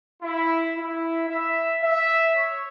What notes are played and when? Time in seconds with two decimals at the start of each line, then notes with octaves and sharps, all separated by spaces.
0.22 E4
0.76 E4
1.29 E5
1.82 E5
2.36 C#5